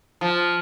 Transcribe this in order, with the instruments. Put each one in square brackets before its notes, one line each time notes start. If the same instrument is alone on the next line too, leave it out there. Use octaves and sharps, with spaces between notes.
[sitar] F3